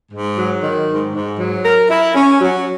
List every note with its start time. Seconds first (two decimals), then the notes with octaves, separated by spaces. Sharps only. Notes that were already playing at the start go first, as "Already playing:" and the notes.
0.12 G#2
0.37 F#3
0.63 D#3
0.88 G#2
1.13 G#2
1.39 F#3
1.64 A#4
1.90 E4
2.15 C#4
2.41 F#3